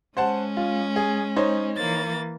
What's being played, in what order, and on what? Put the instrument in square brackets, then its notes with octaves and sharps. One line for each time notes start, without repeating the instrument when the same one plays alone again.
[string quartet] G#3 C#4 [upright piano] C5 F#5 A5
[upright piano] F4
G#4
D#4 C5 C#5
[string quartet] E3 A#3 A6